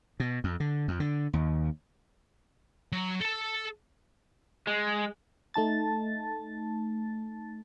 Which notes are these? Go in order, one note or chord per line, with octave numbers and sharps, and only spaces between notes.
B2
F2
D3
F2
D3
D#2
F#3
A4 A5
G#3
A3 D#4 A5 A6